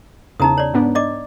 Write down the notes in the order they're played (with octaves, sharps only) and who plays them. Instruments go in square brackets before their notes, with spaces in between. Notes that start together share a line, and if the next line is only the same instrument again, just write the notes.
[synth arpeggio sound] E2 C#3 [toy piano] D#4 A#5 D#6
[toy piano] C#5 D5
[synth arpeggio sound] G#2 B3 D4
[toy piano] D5 D#5 D6